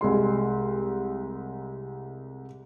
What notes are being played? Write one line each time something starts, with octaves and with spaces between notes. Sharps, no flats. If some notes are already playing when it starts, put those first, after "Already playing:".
C2 G#3 C6